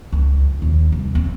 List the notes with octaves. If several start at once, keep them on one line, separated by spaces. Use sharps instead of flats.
C#2
D#2
C2
C4